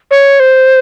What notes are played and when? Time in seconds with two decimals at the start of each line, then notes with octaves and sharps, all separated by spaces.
0.11 C#5
0.40 C5